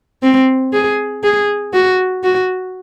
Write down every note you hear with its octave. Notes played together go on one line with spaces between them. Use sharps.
C4
G#4
G#4
F#4
F#4